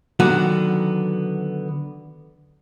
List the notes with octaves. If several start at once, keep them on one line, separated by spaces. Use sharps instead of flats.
D3 D#3 F#3 B3 F#4